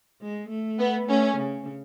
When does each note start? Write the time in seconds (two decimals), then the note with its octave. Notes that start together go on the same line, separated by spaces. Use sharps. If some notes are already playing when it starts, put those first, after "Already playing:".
0.22 G#3
0.49 A3
0.79 B3
1.08 A3 C#4
1.37 C#3